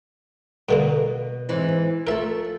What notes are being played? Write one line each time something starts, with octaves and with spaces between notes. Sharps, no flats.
G2 B2 D3 A#3 B3
G#2 E3 C4
F3 A3 A4 A#4 E5